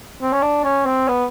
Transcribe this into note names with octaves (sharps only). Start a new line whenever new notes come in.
C4
C#4
D4
C#4
C4
B3